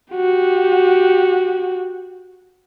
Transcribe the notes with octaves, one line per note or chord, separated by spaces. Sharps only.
F#4 G4